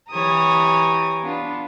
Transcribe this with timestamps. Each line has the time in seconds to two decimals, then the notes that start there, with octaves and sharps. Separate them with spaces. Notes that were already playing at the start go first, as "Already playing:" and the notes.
0.11 E3 G4 C#5 A#5 D#6
1.21 B3 D4 F4